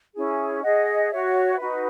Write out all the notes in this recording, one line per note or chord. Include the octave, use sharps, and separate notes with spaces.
C#4 E4 G#4
G#4 D#5 F#5
F#4 C#5 E5
D#4 F#4 B4